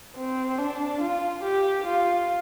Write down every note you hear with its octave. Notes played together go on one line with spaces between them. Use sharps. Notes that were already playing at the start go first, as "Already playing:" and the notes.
C4
D4
F4
G4
F4